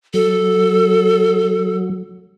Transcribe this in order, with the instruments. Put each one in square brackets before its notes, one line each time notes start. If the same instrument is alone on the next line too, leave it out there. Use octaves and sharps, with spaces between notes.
[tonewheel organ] F#3 [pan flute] A4